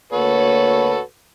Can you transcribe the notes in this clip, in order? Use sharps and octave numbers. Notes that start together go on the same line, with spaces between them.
D2 A#3 F#4 A4 B4 C#5